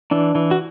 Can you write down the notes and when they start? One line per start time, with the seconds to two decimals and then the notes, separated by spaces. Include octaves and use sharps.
0.11 E3 D4
0.35 E3
0.51 F#4